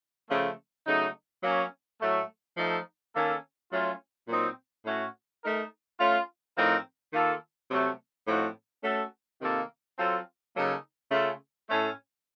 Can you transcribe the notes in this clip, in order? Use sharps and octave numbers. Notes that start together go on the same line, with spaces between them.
C#3 F3 A3
C#3 F#3 A3 D#4
F#3 A#3 C#4
A2 F#3 A3
F3 A3 D#4 A4
D#3 A#3 C#4 A4
F#3 A3 C#4 F4
A#2 F#3 C4 D#4
A2 A3 C#4 F#4
A3 D#4 A#4
A3 C#4 F4
A2 F3 C4 D#4 A#4
D#3 A#3 F4 A4
C3 F#3 A3
A2 F3 C4 D#4 F#4
A3 C#4 F#4 A4
C3 D#3 A#3 F4 A4
F#3 C4 F4 A4
C#3 F#3 A#3 D#4 A4
C#3 A3 C#4 F4 A4
A2 A3 C#4 A4